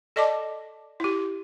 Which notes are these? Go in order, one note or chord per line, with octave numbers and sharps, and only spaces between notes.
A4 D5 D#5 A5 D6
E4 G4